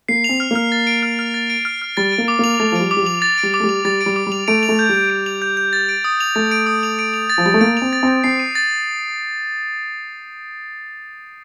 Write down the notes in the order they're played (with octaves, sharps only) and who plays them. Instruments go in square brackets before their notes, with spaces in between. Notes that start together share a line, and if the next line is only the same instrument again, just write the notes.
[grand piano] A#3 [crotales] C7
[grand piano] C4 [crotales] F7
[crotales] F6
[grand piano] A#3 [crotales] F6
[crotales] A6
D7
F6
F6
A6
D7
F6
F6
[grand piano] G3 [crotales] A6
[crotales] D7
[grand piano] A#3
[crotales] D6
[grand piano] A#3 [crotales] F7
[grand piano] A3 [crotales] A6
[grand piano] F3
[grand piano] G3 [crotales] D7
[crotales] D6
[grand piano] G3
[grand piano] F3 [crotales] F7
[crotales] A6
D7
[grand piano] G3
[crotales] D6
[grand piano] A3
G3
[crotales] F7
[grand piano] G3 [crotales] A6
[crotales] D7
[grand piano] G3
[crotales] D6
[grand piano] G3
[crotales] F7
[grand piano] A3 [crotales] D7
[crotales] F7
[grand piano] A3
[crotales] G6
[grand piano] G3
[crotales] G6
D7
F7
G6
G6
A6
D7
D#6
F7
[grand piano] A3 [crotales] A6
[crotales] D7
D#6
F7
D7
F7
A6
[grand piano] F3
[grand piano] G3 [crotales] A6
[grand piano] A3
[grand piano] A#3 [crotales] D7
[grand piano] C4 [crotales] F7
[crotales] A6
[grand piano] C4
[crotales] A6
[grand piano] C4 [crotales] C7
[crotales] D#7
A6